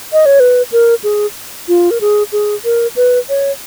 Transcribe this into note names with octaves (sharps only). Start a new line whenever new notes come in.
D#5
C#5
B4
A#4
G#4
F4
A#4
G#4
G#4
A#4
B4
C#5